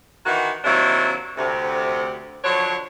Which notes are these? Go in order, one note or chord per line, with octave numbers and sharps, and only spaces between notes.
D#3 E3 F#4
C3 D#3 F#3 A#3 D4 E4
D2 C3
D3 F3 F#3 D4 C#5